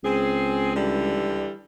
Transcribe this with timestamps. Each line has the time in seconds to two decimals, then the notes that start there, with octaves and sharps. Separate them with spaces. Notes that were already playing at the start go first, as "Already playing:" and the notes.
0.03 C#2 C4 G#4
0.75 D3 E3 G3